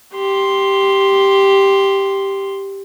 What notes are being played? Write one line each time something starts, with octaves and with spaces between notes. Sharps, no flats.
G4 C6